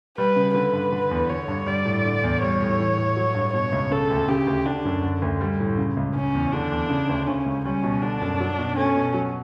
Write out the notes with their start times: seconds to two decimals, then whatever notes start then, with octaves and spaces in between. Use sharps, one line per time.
0.17 G3 B4
0.36 C#3
0.54 D3 B4
0.73 G2
0.92 D3
1.11 E2
1.30 D3 C#5
1.48 G2
1.66 G3 D5
1.85 A2
2.05 D3
2.23 E2
2.42 G3 C#5
2.61 A2
2.80 E3
2.97 A2
3.16 F#3
3.35 G2
3.54 B2 C#5
3.72 C#2
3.91 C#3 A4
4.10 D2
4.28 C#3 G4
4.47 D2
4.66 D3 D4
4.85 F#2
5.03 D3
5.22 D2
5.41 G3
5.60 A2
5.77 C#3
5.97 C#2
6.15 C#3 C#4
6.35 E2
6.53 D3 D4
6.72 E2
6.90 C#3
7.09 D2
7.27 C#3 C#4
7.46 C#2
7.65 G3 C#4
7.83 B2
8.02 D3 D4
8.22 F#2
8.40 F#3
8.58 B2
8.77 A3 C#4
8.95 B2
9.14 F#3